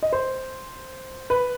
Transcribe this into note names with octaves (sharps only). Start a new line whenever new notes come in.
D#5
C5
B4